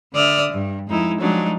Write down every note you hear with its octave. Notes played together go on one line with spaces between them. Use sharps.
D3 D5 E5 D#6 F6
G2
F2 G#3 D#4 E4
F3 F#3 G#3 D4 D#4